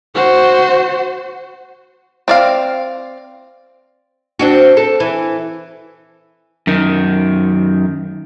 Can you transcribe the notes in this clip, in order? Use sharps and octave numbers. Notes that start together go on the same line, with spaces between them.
F#4 C5
C4 D5 F5
C4 D4 F#4
A4
E3
F#2 D#3